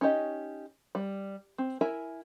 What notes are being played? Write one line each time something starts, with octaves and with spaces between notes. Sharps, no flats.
C#4 D#4 G4 D#5
G3
C4
E4 A#4 E5 G#5